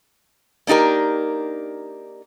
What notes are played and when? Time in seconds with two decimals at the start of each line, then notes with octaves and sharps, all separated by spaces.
0.67 A#3 D4 D#4 G4 A#4